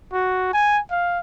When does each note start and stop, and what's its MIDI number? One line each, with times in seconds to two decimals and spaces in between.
0.13 0.51 66
0.53 0.79 80
0.91 1.19 77